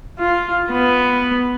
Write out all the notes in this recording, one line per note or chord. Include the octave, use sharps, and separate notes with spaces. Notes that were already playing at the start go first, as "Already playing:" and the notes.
F4
B3